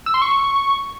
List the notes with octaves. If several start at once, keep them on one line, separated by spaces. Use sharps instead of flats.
E6
C6
C#6